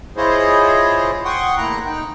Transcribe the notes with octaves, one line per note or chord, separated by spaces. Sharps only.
E4 F4 G#4 C5 C#5 D#5
F#5 G5 C6 C#6 D#6
E2 A3 A#3 E4 A#5 F#6
D#4 G5